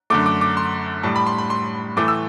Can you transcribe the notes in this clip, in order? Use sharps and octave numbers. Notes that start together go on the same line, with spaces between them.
F#2 D3 A3 D6
D6
D6
C6
A2 G3 A5
B5
C6
B5
C6
A2 E3 A3 D6
E6